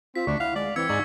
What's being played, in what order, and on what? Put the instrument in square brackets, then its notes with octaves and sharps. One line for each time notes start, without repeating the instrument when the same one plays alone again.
[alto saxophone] C4 [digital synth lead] F4 [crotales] B6
[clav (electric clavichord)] D2 [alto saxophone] D4 [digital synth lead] C#6
[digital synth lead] E4 [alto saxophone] F5 [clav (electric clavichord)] F#5
[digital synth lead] G#3 [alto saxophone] D5
[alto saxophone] E3 [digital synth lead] C4 [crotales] E6 G#6 C#7
[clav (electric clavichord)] G#2 G#5 [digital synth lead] D#4 [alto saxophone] D5 [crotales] C#6